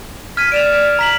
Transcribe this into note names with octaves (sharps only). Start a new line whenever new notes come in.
F6 G#6 B6 D#7
D5 D7 E7 F7
A#5 B6 F#7